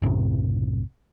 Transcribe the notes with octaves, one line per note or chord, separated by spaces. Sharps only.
B1 F#2 A2 C3